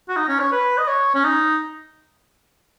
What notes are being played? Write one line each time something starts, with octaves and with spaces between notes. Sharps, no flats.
F#4
D#4
C#4
C#5
B4
D#5
C#5
C#4
D#4